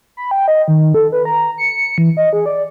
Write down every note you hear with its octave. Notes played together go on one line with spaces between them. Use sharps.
B5
G5
D#5
D#3
A4
B4
A#5
C#7
E3
D#5
G#4
D5